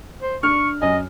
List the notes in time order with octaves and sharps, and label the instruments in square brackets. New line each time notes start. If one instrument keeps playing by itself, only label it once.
[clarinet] C5
[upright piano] D4 F6 [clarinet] C#6
[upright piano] F#2 G#5 [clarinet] D#5